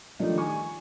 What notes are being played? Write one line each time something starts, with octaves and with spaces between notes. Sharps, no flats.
D#3 F3 G3 A3 D4 D#4
G#5 C#6